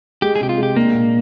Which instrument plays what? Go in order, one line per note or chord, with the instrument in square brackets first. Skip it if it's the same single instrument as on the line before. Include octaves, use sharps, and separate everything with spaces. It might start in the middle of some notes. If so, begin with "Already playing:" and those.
[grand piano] G#3 [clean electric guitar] G4
[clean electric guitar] G#4
[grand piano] C3 [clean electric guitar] G4
[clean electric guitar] F4
[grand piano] G#3
[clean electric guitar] G4
[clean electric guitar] A#3 [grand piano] D4
[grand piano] A#2